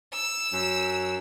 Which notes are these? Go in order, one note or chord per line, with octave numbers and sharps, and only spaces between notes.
E6
F#2